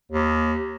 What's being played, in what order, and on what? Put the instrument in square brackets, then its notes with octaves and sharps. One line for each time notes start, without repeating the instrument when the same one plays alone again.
[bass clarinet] D#2